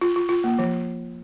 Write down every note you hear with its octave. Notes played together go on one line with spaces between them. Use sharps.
F4
F4
F4
A#3
F3